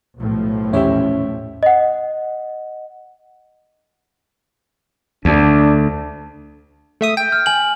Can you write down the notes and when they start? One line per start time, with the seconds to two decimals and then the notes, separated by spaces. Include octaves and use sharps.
0.17 B1 A2 F3
0.73 E2 C#4 E4 G4 C#5 E5
1.63 D#5 F#5
5.25 D2 D4
7.01 A3 E5 D#6
7.17 G5
7.32 F6
7.46 G#5 F#7